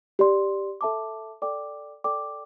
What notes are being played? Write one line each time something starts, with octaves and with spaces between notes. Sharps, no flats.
G4 D5 C6
A4 E5 A5 D6
A4 D5 G5 D6
A4 D5 G5 D6